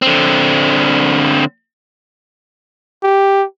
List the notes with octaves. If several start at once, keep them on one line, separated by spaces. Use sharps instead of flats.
D3 C4
G4